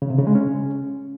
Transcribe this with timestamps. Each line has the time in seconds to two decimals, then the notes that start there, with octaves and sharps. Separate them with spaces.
0.02 C#3
0.10 C3
0.18 C#3
0.27 G#3
0.35 C#4